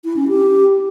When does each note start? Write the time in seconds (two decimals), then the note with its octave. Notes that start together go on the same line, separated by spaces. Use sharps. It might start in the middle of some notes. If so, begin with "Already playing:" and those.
0.05 E4
0.16 C#4
0.28 G4